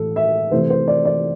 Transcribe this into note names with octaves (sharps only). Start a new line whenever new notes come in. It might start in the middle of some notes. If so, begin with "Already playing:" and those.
Already playing: A2 E3 A4
E5
C3 E3 A3 C5
C5
D5
D5